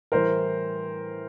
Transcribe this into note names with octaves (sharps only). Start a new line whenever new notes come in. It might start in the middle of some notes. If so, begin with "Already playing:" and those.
A2 E3 G3 A#4 C5